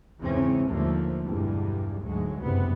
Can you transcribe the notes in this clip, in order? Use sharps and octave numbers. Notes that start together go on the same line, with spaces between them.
E2 G#2 C#3 E3 C4 C#4
D#2 G#2 D3 F3 A3 A#3
B1 E2 G2 D3 G3 G#3
D2 G#2 F#3 G#3
F#1 D2 G2 C3 B3